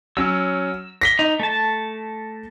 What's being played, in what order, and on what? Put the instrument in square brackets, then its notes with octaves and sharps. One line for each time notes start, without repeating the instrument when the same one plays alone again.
[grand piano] F#3 C#4 [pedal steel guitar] E6
[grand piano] A#6 B6 G7
[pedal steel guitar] D#4
A3 A5